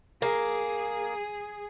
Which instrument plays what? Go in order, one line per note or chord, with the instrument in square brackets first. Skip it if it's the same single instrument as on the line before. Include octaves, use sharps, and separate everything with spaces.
[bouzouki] A#3 [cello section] G#4